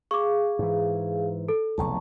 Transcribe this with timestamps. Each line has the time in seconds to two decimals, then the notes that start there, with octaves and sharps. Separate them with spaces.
0.11 G#4 F5 C#6 D6
0.59 G#2 E3
1.49 A4
1.78 F1 B1 E2 A5 A#5 C#6